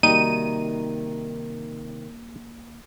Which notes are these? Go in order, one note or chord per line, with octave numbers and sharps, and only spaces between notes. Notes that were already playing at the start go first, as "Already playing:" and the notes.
C3 D#3 G3 A#3 D#4 F#4 D#7